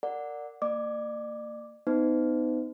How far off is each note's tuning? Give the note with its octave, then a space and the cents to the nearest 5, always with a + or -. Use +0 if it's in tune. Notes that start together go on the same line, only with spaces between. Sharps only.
A#4 -20 D5 +0 F#5 -10
A#3 -35 D5 +40 D6 +0
B3 +25 D#4 +0 C5 -45